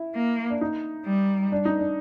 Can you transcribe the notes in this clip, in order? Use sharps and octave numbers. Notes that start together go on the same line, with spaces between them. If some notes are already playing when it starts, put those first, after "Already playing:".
Already playing: E4
A#3
D4
D#4
G3
D4
D#4
D4